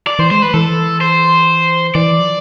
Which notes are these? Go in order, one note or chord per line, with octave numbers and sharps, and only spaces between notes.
D5
E3 C5
G#3 C5
B4
E3 A4
C5
E3 D5
F3